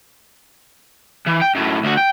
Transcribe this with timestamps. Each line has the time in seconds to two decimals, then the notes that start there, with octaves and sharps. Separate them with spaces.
1.27 E3
1.42 G5
1.55 F#2 A2
1.84 D2 F#4
1.97 G5